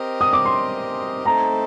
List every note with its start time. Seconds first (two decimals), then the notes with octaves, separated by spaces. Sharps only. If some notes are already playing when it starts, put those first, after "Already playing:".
Already playing: C4 G4 A#4 D#5
0.21 D#6
0.33 D6
0.45 C6
1.25 A3 C4 D#4 A4 A#5